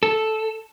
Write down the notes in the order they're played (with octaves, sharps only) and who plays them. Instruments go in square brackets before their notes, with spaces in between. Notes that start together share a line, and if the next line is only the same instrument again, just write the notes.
[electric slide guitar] A4